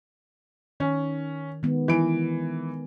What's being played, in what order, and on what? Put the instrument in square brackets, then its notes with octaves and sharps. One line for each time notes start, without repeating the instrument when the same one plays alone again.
[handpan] D#3 [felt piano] C#4
[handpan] D#3 G#3 B3
[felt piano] E3 D7